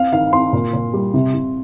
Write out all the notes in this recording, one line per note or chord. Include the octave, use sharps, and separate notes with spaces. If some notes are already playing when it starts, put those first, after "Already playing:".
Already playing: C4 F5
D#3 F5
C4 C6
A#2
A#2
G3
C3
C3